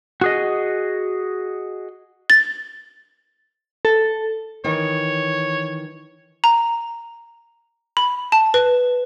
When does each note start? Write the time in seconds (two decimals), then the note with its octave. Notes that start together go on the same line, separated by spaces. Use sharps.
0.21 F#4 G#4 D#5
2.30 A6
3.85 A4
4.64 D#3 E3 C#5
6.44 A#5
7.97 B5
8.32 A5
8.54 B4